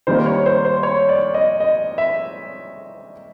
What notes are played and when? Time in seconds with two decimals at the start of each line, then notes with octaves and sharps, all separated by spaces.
0.07 D#3 G3 A#3 C5
0.26 C#5
0.46 C5
0.65 C5
0.83 C#5
1.09 D5
1.34 D#5
1.60 D#5
1.98 E5